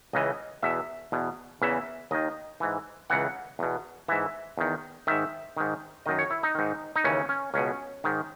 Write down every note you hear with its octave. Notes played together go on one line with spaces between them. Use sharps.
C#2 C#3 E3 D#5
E2 B2 E5
E2 B2
E2 C#3 E3 E5
D#2 D#3 D#5
G#2 E3
C#2 C#3 E3 F#5
E2 B2
G#2 E3 E5
E2 D#3
G#2 D#3 E5
G#2 D#3
F#2 D#3 D#5
C#5
E4
D#4
G#2 D#3
D#4
D#2 C#3 E3 C#4
C#4
C#2 B2 C#4
G#2 D#3